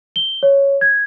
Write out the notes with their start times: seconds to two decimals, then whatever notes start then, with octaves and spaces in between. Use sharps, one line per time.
0.16 G7
0.43 C#5
0.81 G#6